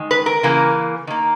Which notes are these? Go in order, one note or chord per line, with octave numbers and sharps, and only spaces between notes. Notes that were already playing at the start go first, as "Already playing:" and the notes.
Already playing: D#3 G#3
B4
A#4
C#3 E3 A#3
D#3 A#3